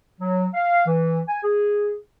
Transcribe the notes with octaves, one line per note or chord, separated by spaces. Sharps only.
F#3
F5
E3
G#5
G#4